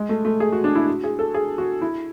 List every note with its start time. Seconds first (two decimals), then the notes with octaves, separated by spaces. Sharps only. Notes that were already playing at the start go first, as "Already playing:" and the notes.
Already playing: G#3
0.09 A3
0.25 A3
0.40 G#4
0.52 F#4
0.64 D4
0.75 E4
0.88 F#4
1.04 G#4
1.19 A4
1.34 G#4
1.58 F#4
1.81 E4